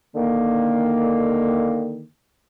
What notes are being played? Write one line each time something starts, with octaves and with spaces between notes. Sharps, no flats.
D3 D#3 A#3